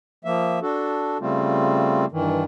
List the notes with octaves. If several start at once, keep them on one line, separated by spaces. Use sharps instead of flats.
F3 A#3 E5
D4 F#4 A4
C#3 G3 A3 C4 F4
G2 D#3 E3